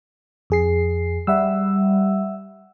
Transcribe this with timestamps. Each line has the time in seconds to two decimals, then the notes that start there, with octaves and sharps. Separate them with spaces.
0.50 F2 G#4 C7
1.27 G3 E5 F#5 E6